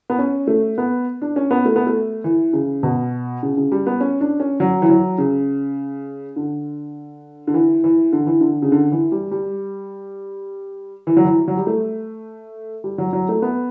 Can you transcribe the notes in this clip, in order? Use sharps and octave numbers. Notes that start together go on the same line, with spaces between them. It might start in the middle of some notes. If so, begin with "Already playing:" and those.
B3
C#4
A3
B3
D4
C#4
B3
A3
B3
A3
E3
C#3
B2
C#3
C#3
G3
B3
C#4
D4
C#4
F#3
E3
F#3
C#3
D3
D3
E3
E3
D3
E3
D3
C#3
D3
E3
G3
G3
E3
F#3
E3
F#3
G3
A3
G3
F#3
F#3
A3
B3